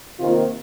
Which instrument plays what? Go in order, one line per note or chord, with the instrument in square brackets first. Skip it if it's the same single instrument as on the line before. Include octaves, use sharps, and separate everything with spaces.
[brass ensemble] C3 D#3 A#3 F4